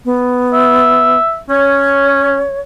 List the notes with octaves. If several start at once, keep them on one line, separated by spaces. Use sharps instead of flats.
B3
E5
C#4 C#5